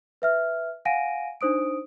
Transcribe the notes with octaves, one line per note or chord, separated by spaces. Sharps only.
B4 E5 F6
F5 F#5 G#5 A#6 D7 D#7
D4 D#4 C5 D#6 D7